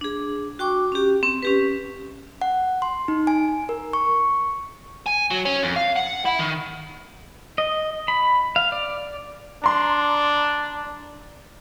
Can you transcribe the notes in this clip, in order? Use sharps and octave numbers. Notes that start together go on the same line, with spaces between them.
D4 G#4
F#4 G5 C#6 D6
C#4 G4
C4
C#4 G4 B4
F#5
C6
D#4
G#5
A#4
C#6
G#5
F#3
C#4
F2
F5
F#5
E4
D#3
D#5
B5
F5
D5
D4 A#5 C6